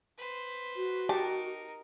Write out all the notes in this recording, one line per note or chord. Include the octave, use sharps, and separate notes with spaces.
B4 C5
F#4
D#4 G4 A#4 A5